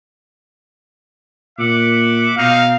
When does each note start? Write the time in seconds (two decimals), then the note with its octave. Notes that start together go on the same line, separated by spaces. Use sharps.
1.59 A#2 E5 F#5 D6
2.37 B2 A#3 C4 D#4 F5